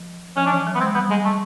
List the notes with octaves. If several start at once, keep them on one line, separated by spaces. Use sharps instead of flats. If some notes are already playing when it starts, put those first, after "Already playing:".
Already playing: F3
F3 C#4
D4
E3 C#4
F#3
B3
G#3 C4
G3 B3
G#3
A3